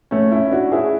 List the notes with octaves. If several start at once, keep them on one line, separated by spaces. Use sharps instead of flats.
A3 C#4
C#4 E4
D4 F#4
E4 G#4